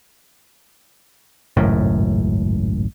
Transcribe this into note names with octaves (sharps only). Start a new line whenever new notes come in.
G#1 C#2 F#2 A2